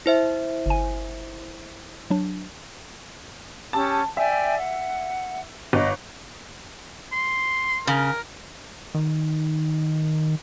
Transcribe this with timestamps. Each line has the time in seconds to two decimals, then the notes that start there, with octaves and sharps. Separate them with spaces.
0.06 E4 C5 E5
0.66 G1 G#5
2.10 F#3 D4
3.73 C#4 G4 A5 E6
4.17 D5 E5 G5 G#5
4.58 F#5
5.73 G1 D#5
7.12 C6
7.87 C#3 A#4
8.95 D#3